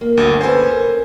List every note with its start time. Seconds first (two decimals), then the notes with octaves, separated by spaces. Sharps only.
0.01 A#3
0.17 G1 D2
0.41 C#4 A4 B4 C5 G#5
0.71 A#4